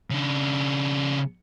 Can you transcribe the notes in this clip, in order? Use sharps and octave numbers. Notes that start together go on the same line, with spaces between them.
C#3 D4